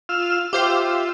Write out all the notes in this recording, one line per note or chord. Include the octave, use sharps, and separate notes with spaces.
F4 E6 F6
F4 G4 C5 E5 F5